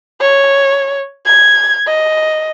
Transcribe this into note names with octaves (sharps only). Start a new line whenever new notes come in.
C#5
G#6
D#5